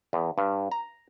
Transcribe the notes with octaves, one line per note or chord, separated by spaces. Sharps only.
E2
G2
A#5